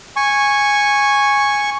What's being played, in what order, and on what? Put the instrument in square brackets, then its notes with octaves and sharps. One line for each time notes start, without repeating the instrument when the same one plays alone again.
[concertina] G#5 C#6